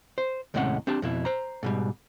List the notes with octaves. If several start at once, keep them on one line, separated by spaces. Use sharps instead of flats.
C5
D#2 A2 C3 G#3 C#4 F#5
C4 D4 G4 A5
F2 B2 E4
C5 A#5
G#2 B2 G3